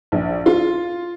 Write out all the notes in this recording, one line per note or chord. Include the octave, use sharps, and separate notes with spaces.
A#1
F4